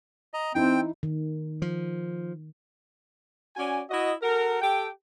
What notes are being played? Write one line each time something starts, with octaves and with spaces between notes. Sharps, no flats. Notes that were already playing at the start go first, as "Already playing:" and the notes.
D#5 A#5
E3 C4 D#4 E4 G5
D#3
F3
C#4 F#4 D5 G#5
E4 F#4 D#5
F#4 A4 A#4
G4 A4 G5